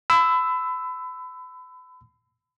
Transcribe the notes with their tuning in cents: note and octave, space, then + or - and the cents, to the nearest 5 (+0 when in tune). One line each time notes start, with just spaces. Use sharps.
B5 +35 E6 +0